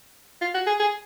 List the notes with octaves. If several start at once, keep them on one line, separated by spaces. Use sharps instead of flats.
F4
F#4
G#4
G#4